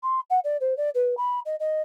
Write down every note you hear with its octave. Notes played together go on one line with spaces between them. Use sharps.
C6
F#5
D5
C5
D5
B4
B5
D#5
D#5